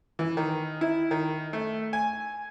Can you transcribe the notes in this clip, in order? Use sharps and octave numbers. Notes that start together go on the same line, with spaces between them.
E3
D#3
E4
D#3
A3
G#5